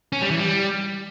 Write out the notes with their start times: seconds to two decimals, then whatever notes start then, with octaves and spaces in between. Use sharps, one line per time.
0.13 C#4
0.22 G3
0.30 E3
0.39 G3